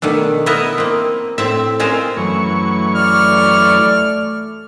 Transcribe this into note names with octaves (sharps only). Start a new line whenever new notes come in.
B2 D#3 A3 D4
B3 E4 A#4 D#5 E5 A5
A#3 C4
A2 C4 E5
G#3 C4 C#4 F4 A#4 C5
F#2 E3 A3 C#6
D5 F6